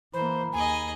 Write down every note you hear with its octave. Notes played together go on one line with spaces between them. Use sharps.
E3 A#3 C5 A#5 B5
D#2 G#4 D#5 G#5